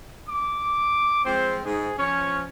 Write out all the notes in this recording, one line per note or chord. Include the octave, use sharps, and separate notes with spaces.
D6
F3 G#3 C4 C5
G#2 G#4
F3 C#4 C#5